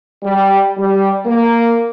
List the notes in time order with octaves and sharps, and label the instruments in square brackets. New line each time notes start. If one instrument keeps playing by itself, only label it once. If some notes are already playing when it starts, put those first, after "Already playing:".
[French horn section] G3
G3
A#3